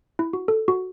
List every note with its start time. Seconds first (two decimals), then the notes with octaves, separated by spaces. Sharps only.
0.19 E4
0.33 F#4
0.48 A4
0.68 F#4